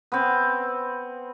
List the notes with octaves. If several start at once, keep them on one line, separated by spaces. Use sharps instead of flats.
B3 C4